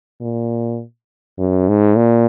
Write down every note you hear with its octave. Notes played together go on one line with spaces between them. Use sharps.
A#2
F#2
G#2
A#2